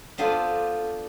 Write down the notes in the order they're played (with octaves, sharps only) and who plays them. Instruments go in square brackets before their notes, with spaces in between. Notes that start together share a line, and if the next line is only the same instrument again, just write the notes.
[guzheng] B3 D4 F4 A4 C5